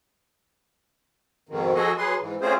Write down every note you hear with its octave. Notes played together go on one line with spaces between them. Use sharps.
F2 G#2 B2 D#3
F3 F#4 G#4 A4 D#5
F#3 G#4 B4 C6
G#2 E3
A3 C4 C#4 F4 G#4 C5